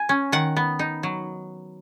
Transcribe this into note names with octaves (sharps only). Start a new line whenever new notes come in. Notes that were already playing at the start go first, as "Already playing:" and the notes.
Already playing: G#5
C#4
D#3 F#5
B3
D#4
F#3